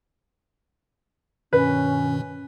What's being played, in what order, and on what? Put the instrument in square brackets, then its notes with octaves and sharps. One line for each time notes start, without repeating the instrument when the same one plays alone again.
[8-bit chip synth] G2 B2 D#3 [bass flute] C#4 [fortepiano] B4